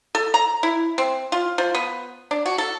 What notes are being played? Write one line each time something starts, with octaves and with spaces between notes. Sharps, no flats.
A4
A#5
E4
C4
F4
F3
B3
D4
F#4
A4